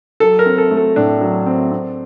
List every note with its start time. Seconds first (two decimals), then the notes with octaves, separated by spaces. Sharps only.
0.20 F#3 A4
0.39 A#4
0.46 C4
0.58 A4
0.71 A3
0.77 A4
0.96 A2 D4
1.21 F#3
1.46 C4
1.71 C4